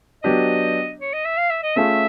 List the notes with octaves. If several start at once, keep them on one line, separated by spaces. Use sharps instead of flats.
F#3 B3 D4 G4 D#5
C#5
D#5
E5
F5
E5
D#5
A3 C#4 F4 G#4 E5